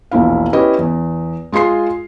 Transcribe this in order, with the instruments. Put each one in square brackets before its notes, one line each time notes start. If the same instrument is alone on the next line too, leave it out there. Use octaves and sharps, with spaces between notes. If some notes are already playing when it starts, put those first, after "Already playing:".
[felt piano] E1 A#1 E4 F5
C#4 E4 G4 B4 D#5
E2
G#3 F4 G#4 C6 C7